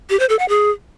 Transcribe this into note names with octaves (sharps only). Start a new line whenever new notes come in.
G4
C5
A4
F#5
G#4